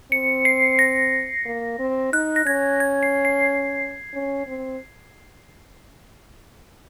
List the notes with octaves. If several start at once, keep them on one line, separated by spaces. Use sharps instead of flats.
C4 C#7
C7
A#6
A#3
C4
D#4 F#6
A#6
C#4 G#6
G#6
C7
C7
C#4
C4